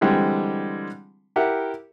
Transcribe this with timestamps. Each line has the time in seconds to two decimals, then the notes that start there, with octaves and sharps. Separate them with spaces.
0.01 D3 E3 G3 G#3 C4 G4
1.36 E4 G4 A#4 E5 F#5